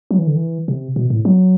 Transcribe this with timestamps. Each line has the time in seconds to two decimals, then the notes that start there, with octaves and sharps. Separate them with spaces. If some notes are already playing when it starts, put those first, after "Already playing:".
0.11 F#3
0.19 E3
0.27 D3
0.36 E3
0.68 C3
0.96 B2
1.10 A2
1.25 F#3